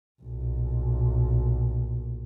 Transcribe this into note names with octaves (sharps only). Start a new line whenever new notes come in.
B1 A#2